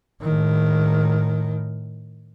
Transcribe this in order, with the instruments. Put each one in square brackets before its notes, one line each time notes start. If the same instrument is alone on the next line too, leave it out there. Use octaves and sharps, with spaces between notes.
[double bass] A2 D#3